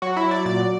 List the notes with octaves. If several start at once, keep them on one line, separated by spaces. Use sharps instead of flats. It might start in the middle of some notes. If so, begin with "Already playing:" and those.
F#3 F#4
E4
F#3
D5
A#2 D5